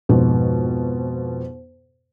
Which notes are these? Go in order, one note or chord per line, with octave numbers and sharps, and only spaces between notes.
F2 G#2 B2